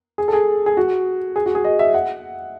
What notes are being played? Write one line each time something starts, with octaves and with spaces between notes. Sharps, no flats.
G#4
A4
G#4
G#4
F#4
G#4
F#4
G#4
D#5
E5
F#5